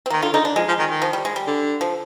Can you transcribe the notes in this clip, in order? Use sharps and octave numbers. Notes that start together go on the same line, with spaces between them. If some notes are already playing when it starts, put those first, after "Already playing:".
C4
D#3 A#3
D3 F4
D3 D#4
D4
F3 G#3
F3
D#3
D#3
F3
G3
G#3
G3
D3
F3